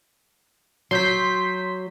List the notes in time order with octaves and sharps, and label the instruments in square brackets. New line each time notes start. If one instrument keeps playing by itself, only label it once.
[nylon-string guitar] F#3 [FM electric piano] C6 G6 B6